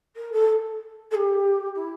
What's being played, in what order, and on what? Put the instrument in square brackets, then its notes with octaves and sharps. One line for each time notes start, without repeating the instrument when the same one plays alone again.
[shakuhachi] A#4
A4
A4
G4
E4